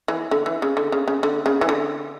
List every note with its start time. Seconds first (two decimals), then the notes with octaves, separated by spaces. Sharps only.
0.08 E3
0.31 D3
0.46 E3
0.62 C#3
0.77 D3
0.92 C#3
1.08 C#3
1.23 D3
1.46 C#3
1.61 E3
1.69 D3